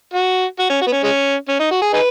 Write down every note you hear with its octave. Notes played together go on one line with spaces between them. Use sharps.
F#4
F#4
C#4
F#4
B3
C#4
G#3 C#4
C#4
D#4
F#4
G#4
D#4 G#4 B4